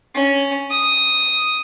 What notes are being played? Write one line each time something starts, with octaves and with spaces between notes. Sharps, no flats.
C#4
D#6